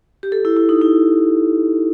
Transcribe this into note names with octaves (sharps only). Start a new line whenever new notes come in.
G4
A4
E4
E4
D#4
E4